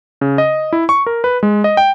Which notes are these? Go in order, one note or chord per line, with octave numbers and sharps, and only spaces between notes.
C#3
D#5
E4
C#6
A#4
B4
G#3
D#5
G5